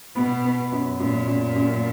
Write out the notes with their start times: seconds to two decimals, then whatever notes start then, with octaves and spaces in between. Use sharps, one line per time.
0.15 B2 B3
0.44 B3
0.72 F#2
0.99 F#2 A#2
1.27 F#2
1.56 F#2